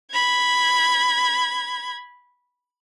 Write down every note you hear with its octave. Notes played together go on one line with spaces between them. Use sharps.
B5 G#6